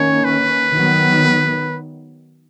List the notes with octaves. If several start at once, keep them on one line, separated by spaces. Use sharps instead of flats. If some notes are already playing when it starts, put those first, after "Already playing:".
Already playing: D#3 A#3 C#4 C#5
B4
D#3 F#3 B3